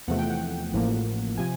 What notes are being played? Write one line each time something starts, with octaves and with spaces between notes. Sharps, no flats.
E2 C3 F3 A3 F#5
G5
F#5
A1 A2 F3 A#3
C3 F3 G#5